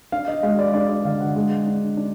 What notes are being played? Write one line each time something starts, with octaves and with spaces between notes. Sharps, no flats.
D4 F5
D#5
G#3 F5
D5
D4 D5
D5
D3 F5
F#5
G#3
D4
D4